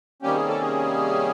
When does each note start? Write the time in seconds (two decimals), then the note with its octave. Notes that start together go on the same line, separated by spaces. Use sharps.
0.22 C3 D#3 G3 A#3 C#4 G4
0.35 G#4
0.48 A4
0.61 G#4